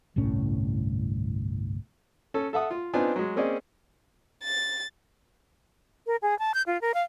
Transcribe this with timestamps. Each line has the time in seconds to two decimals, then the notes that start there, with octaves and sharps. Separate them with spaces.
0.16 G1 C2 A2 C#4
2.34 C#4 A4
2.53 A4 E5 F#5 D#6
2.71 F4
2.94 B3 C4 D4 D#4 F4 G#5
3.16 F#3 G#3
3.36 A#3 C4 C#4 G#4 D5 D#5
4.44 A6
6.07 A#4
6.22 G#4
6.39 A5
6.54 G6
6.67 F4
6.81 A#4
6.94 F5